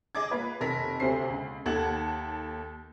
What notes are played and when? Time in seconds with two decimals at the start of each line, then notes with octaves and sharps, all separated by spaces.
0.15 G#4 D#5 D6 G#6
0.31 A#3 F4 B4
0.61 F1 A#4 A#6 B6
1.00 D2 C3 C5 C7
1.30 C#2
1.66 D#2 A4 F#5 A5 G#6 F#7